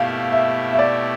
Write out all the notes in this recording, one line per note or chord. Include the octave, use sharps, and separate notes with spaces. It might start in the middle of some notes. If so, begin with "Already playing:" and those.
Already playing: B2 A3 E4 G4 F5
E5
E5
D5